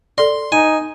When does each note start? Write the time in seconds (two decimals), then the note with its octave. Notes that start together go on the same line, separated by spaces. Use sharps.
0.18 A4 D5 C6
0.52 D#4 G#5